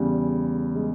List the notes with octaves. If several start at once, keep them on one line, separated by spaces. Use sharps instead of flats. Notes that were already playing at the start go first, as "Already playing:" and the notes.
Already playing: E2 C#3 G3
G#3